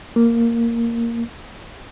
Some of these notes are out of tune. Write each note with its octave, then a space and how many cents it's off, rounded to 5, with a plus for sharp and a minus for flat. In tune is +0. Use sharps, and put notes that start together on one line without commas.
A#3 -5